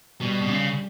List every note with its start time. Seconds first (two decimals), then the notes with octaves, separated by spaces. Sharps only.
0.21 B2 G3
0.42 B2
0.49 C#3